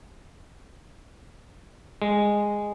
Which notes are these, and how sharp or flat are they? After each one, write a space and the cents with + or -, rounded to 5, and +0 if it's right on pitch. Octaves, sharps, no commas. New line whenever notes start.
G#3 -10